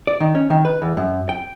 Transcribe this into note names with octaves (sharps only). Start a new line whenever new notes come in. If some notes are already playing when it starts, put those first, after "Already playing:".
D5
D#3
C#4
D#3
B4
E2
F#2
G5